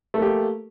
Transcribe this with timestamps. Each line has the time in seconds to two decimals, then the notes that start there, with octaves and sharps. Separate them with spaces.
0.14 A3
0.18 A#3
0.22 G4